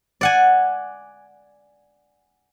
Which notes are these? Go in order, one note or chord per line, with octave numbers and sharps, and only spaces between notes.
D5 F#5 G#5